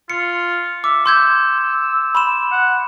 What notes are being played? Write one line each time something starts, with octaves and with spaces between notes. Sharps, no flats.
F4 C#7
E5 D6
C6 E6 G6 G#6
B5 C6 E7
F#5